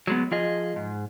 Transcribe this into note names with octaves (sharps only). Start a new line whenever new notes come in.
F#3 G#3 B3
F3 F4 G#4 D#5
G#2